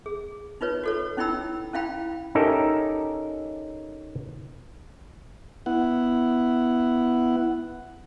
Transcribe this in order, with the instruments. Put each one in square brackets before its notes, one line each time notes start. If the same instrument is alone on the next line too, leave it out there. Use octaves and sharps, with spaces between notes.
[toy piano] G#4
D#4 F4 B4 C#5
F#4 A4 C#5
C#4 D#4 E4 G5 B5 E6
C#4 E4 F5 G5 B5
[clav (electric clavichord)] C#4 D#4 G4 A4 A#4 E5
[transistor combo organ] B3 E4 F#5